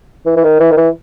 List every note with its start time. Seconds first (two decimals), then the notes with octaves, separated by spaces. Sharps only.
0.26 E3
0.36 E3
0.44 D#3
0.60 E3
0.71 D#3
0.77 E3